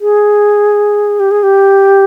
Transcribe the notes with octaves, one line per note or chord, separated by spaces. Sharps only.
G#4
G4
G#4
G4